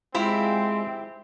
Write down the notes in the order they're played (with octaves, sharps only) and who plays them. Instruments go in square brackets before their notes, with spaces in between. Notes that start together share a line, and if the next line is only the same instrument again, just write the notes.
[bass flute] G#3 [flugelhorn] C4 [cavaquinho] E4 G4 B5 [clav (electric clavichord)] F4